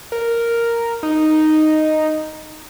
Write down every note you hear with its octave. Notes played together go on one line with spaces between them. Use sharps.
A#4
D#4